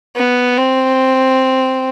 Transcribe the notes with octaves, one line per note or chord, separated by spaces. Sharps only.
B3
C4